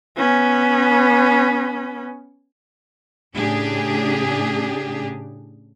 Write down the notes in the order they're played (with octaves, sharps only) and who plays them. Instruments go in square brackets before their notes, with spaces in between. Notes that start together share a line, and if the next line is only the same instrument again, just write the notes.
[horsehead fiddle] B3 C#4
[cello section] A2 C#3 D4 G4 G#4